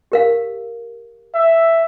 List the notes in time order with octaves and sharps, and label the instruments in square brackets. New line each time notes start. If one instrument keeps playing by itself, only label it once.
[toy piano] G4 A#4 F5
[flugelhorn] E5